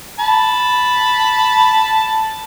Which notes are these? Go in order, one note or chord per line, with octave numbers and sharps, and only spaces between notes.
A5 B5